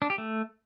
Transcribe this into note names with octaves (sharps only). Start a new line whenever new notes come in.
D4
G4
A3